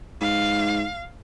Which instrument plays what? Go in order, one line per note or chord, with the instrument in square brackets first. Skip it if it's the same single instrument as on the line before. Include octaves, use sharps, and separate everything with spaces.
[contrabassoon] G#2 [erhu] F5